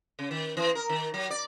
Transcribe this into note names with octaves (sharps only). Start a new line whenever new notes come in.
C#3
D#3
E3
A#4
D#3
F#3
D5